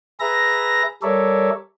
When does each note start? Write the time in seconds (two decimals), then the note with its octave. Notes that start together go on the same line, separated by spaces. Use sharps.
0.20 G#4 B4 E5 A#5 A#6
1.02 G3 A4 A#4 C#5 D5 E5